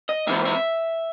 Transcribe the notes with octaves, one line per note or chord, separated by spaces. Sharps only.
D#5
G#2 E3 C4 E5
E5